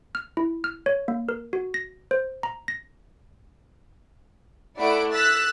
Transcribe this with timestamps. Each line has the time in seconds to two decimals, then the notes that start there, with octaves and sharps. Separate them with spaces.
0.15 F6
0.37 E4
0.64 F6
0.86 C#5
1.08 A#3
1.29 A#4
1.53 F#4
1.74 A#6
2.11 C5
2.43 A#5
2.68 A#6
4.78 A3 E4 D5 F#5 B5 D7
5.12 E6 F#6 A6 B6